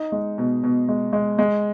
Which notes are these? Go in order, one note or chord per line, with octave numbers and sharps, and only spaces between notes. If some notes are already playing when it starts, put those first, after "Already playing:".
Already playing: D#4
G#3
B2
B2
G#3
G#3
G#3